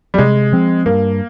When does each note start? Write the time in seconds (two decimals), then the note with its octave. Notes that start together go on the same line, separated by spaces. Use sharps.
0.14 G3
0.18 C3 G#3
0.53 F3 C4
0.86 G2 A#3